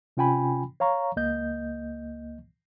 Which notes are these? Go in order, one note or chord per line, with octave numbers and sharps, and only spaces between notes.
C3 C#4 F4 G5 G#5 B5
C#5 F5 A#5 C#6
C#2 A#3 D#5 G6